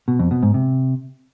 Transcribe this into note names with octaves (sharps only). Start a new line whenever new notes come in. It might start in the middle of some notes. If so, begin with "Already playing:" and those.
B2
F2
B2
G#2
C3